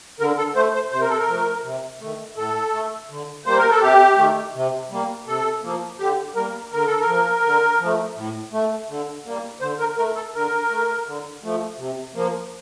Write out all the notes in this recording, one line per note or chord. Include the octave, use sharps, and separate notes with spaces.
D3 A#4
A4
A3 C5
C5
C3 C5
A#4
A4
A#4
F3 A3
C3
D#3 A3
A2 A4
A3
D3
G3 A#3 C5
A#4
A4
C3 G4
D#3 A3
C3
G3 A#3
C3 A4
F3 A#3
D3 G4
G3 A#3 A#4
D3 A#4
A4
A#4
F3
A#3
D3
F3
A3
A2
A3
D3
G3 A#3
D3 C5
A#4
A3 A#4
A4
D3 A#4
A3
D3
F3 A3
C3
F3 A#3